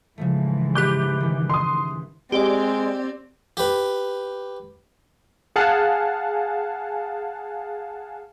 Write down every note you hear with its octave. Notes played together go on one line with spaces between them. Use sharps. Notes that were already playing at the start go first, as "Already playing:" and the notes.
G#2 C#3 E3 F3 A3
G4 B5 D6 F#6 G6 G7
D#3 C#4
C6 D#6
G#3 C4 G4 D5
G4 B4
G#4 F5 F#5 G#5 A5